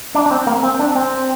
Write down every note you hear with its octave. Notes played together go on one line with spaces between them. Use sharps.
D4
D4
C4
A#3
C4
D4
C4